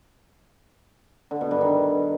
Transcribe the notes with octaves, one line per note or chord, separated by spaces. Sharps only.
D3
B2
G2
D#3